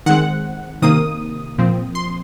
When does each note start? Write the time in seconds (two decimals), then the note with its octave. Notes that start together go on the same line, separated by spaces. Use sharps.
0.06 D#3 G#3 C4 F#5
0.82 C3 D#3 A#3 D#6
1.58 A#2 F3 C4
1.95 C6